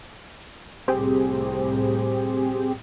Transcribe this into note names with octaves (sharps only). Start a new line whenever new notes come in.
C2 A2 C4 G4 G#4